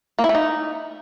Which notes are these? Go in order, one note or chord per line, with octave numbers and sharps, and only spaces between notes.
A#3
E4
A3
D#4